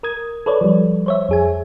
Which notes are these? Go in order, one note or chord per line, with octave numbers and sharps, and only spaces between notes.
A#4 D#6 G#6
A4 B4 C#5 D5
F3 G3
C5 C#5 E5
F2 G#4 G#5